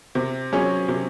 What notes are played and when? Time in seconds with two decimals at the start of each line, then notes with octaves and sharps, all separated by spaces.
0.15 C3
0.52 F#3 C#4 G#4 C#5
0.88 C3